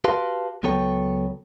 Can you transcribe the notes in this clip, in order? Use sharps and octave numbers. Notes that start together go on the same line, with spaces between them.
F#4 G4 B4 F5 A5 C6
C#2 F#3 B3 A4 C#5 G5